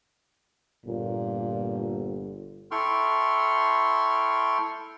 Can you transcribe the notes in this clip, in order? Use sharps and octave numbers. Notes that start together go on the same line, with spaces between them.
G1 A#2
E4 A4 G5 C6 C#6 F6